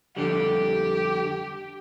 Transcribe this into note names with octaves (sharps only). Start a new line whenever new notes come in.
F2 D3 G3 G4